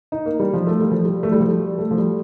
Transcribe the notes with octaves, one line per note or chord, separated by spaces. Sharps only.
D#4
A#3
G3
F3
A3
G3
F3
G3
A3
G3
F3
G3
A3
F3
G3